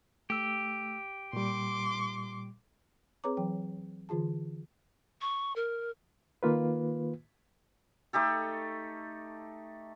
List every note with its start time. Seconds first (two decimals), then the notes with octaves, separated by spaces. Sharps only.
0.30 A3 G4 E6
1.33 A#2 G3 C6 D6
3.24 C4 G#4 B4 C#5 A#5 D6
3.37 E3 F#3 G5
4.09 D3 E3 F4 G#4 A5
5.21 C#6
5.56 A#4
6.43 D#3 A#3 F4 B4
8.13 A3 D#4 G4 A4